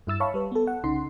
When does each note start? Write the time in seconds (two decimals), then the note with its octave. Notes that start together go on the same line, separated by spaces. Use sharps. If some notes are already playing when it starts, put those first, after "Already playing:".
0.07 G2 E4 E6 A6
0.20 C#5 E5 F5 A5 B5 C#6
0.34 G3 B4
0.52 B3 A4
0.67 F#5
0.84 C2 C#3 D#4 C6 C7